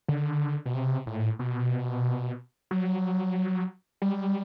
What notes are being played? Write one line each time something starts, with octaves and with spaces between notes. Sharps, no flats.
D3
B2
C3
A2
B2
F#3
G3